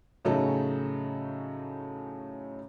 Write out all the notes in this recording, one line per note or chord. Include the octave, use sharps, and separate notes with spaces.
A2 C#3 F#3 C#4 D#4 A4